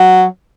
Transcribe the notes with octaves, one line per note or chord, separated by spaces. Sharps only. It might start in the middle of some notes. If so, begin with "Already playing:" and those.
Already playing: F#3